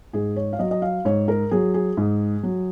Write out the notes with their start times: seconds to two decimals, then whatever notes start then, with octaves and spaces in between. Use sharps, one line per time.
0.13 G#2 G#4
0.36 C#5
0.53 F5
0.59 F#3 D#5
0.71 D#5
0.82 F5
1.05 G#2 C#5
1.28 A#4
1.51 F#3 G#4
1.74 G#4
1.97 G#2
2.43 F#3